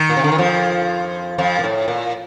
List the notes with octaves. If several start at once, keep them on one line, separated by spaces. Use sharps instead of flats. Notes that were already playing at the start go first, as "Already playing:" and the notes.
Already playing: D#3
A#2
C3
D3
D#3
F2 F3
F2 F3
A#2
A2
A#2